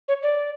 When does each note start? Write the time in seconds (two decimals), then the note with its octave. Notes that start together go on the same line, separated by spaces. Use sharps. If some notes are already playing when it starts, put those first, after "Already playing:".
0.08 C#5
0.23 D5